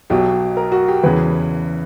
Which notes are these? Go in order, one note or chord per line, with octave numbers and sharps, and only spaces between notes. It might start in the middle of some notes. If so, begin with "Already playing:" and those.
B1 B2 F#3 G4
A#4
F#4
G4
E2 C#3 E3 B4